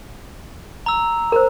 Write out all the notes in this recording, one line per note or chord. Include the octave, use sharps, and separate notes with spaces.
A#5 E6
A#4 C5